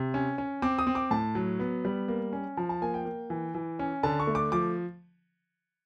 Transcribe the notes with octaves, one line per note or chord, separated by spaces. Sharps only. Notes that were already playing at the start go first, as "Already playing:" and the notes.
Already playing: C3
C#4
C#4
C4 D6
D#6
C4
D6
A2 A5
F#3
B3
G3
A#3
C#4
F3 A5
A5
A#3 G#5
G5
A#3
E3
E3
C#4
D3 A5
C#6
A3
D6
F3 D6